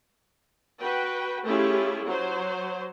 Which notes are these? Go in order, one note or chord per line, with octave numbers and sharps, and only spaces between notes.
F#4 B4 G5
A3 C#4 E4 F4 G4 G#4
F#3 C5